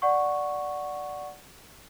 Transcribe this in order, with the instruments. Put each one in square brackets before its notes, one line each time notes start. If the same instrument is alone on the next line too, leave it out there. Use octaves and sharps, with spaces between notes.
[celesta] D5 F#5 C#6